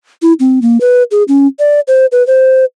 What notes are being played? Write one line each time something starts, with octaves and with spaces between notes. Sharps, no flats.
E4
C4
A#3
B4
G#4
C#4
D5
C5
B4
C5